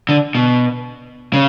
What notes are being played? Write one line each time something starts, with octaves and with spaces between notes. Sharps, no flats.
D3
B2
C#3